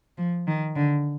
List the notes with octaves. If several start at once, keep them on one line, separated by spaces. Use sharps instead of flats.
F3
D#3
D3